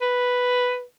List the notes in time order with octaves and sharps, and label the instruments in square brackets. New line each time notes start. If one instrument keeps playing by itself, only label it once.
[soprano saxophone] B4